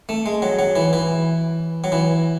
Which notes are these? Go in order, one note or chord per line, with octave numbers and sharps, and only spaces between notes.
A3
G#3
F#3
F#3
E3
E3
F#3
E3